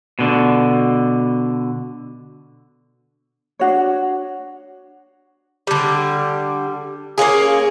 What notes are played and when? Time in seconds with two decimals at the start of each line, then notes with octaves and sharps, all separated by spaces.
0.19 B2 D3
3.59 D4 F#4 C#5
5.67 D3 G3
7.18 A#3 C#4 F4 G#4